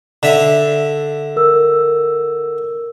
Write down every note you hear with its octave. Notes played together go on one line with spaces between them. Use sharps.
D3 E5
A#4 E6